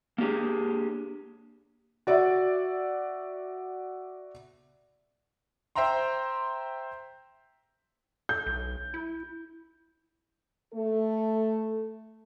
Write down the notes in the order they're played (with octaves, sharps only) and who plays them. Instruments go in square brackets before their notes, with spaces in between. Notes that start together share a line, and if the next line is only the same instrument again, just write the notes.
[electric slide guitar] A#3 D4 G4 G#4
[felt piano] F#4 D5 E5
[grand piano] C5 E5 G5 A#5 C6
[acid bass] A4 [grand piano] G6
[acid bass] B1
E4
[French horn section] A3 A4